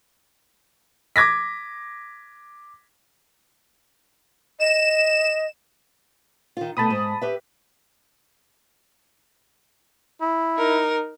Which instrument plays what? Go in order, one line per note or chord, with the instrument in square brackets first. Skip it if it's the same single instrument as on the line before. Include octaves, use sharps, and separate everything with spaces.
[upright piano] D6 G#6 A#6 B6
[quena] D#5 [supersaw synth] E7
[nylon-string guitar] D#3 F4
[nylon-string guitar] B2 A3 [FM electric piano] A5 B5 D#6
[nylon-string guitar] G#2
G4 B4 E5
[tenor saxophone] E4
[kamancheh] D#4 A#4